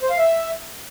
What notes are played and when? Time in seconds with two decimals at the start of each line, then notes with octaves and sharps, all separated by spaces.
0.02 C5
0.10 F5
0.18 E5